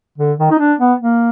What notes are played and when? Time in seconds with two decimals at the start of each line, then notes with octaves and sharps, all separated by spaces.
0.18 D3
0.39 D#3
0.51 D#4
0.59 D4
0.79 B3
1.00 A#3